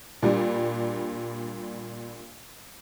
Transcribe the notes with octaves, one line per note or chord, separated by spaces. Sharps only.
A#2 G3 D4